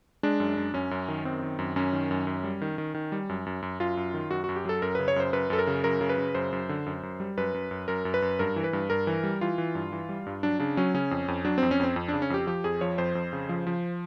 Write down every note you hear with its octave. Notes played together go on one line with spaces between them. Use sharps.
G#3 D4
F#2
F#2
F#2 C#4
F#2
D#3
F#2 C4
D#3
F#2
F#2 C#4
D#3
F#2
F#2
G3
D#3
D#3
D#3
G3
F#2
F#2
F#2
F#2 F4
F#2
D#3
F#2 F#4
F#2 F#4
G4
F#3 A4
F#2 A#4
C#3 B4
C#5
F#2 C5
F#2 B4
F#2 A4
A#4
C#3
F#2 A#4
C#3
B4
C#3
F#2 C5
F#2
D3
F#2
F#2
G3
F#2 B4
F#2
F#2
F#2 A#4
F#2
B4
F#2
G2 A#4
E3
B4
G2
G2 A#4
E3
G3
E3 F4
E3
G2
E3
G3
G2
F#3 D4
C#3 D4
F#3 C#4
C#3 C#4
F2
F2
F#3 D4
F2 C4
C#4
F2 C4
F2
D4
C#3
C#4
F2 G4
F3 G4
F2 G#4
F3 C#5
F2 C5
F2
C#3
F3
F3